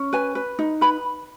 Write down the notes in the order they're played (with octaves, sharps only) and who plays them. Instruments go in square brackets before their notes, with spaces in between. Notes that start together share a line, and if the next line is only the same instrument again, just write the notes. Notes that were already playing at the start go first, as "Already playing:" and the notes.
Already playing: [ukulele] C#4
B4 G#5
B4
D#4
B4 B5